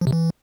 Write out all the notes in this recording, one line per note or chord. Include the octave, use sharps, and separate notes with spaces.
F3
C3
E3